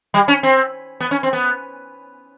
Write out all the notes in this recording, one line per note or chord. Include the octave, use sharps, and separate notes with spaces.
G3
C#4
C4
B3
C#4
C4
B3